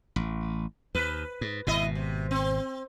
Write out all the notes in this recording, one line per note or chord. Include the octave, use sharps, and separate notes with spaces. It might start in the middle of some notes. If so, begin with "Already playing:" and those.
A1
D#2 B4
G#2
G#1 B2 E4 D#5
C3
C4